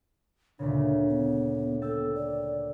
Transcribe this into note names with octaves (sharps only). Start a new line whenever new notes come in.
D2 A#2 C#3 D4
B3
A4 G5 E6 A6
D5